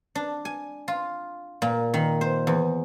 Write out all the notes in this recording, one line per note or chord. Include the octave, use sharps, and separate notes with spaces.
D4
G#5
F4
A#2
D#3
C5
E2